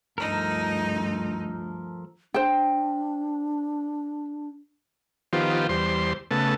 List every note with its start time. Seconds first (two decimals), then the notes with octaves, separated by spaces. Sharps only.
0.18 D2 G2 F3 D#4 A4 A#4
2.34 D4 C5 G5
5.33 D#3 F3 B3 F4 G4 C5
5.69 E2 G3 C5 C6
6.31 C#3 A3 B3 A5